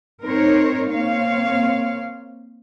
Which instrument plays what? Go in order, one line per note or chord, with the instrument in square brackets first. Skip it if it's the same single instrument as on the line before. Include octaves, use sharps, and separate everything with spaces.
[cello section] C4 D#4 A#4 C5 C#5
A#3 C4 C#5 F5